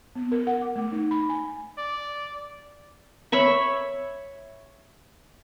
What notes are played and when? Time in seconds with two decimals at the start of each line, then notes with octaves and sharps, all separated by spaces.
0.15 B3
0.32 A#4
0.47 F#5
0.62 D6
0.76 A3
0.92 D#4
1.11 B5
1.29 G#5
1.78 D5
3.32 C#5 E5 B5 C#6